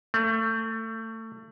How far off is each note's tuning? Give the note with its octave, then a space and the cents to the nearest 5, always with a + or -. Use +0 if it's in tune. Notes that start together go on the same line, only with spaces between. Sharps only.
A3 +25